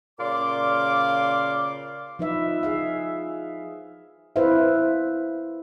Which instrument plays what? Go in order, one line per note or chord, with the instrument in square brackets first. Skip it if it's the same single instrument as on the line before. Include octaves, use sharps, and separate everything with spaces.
[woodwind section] A#2 C#3 D5 F5 C6 D6
[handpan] F3 D#4 B4 E5
G#4 E5 F5
E4 B4 C5 E5 F5